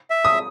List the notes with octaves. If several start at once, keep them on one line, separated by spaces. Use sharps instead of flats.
E5
D#6